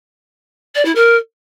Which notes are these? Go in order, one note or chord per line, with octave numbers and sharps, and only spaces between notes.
D5
E4
A#4